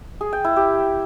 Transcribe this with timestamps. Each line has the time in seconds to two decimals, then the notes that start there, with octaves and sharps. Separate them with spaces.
0.21 G#4
0.33 G5
0.44 E4
0.56 G4